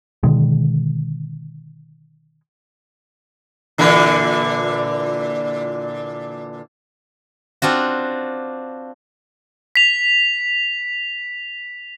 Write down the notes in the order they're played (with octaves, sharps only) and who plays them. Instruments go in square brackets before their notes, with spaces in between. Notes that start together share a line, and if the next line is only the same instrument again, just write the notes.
[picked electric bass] B2 D3 D#3 G#3
[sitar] A#2 D3 E3
[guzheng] C4 D4 F4 F#4
[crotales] B6 F7